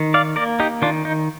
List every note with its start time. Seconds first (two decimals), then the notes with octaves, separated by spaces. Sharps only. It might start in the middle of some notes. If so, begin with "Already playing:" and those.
Already playing: D#3
0.14 D5 F5
0.36 A#3 A#4 D5
0.60 D#4 G4
0.82 D#3 D4 F4
1.05 D#4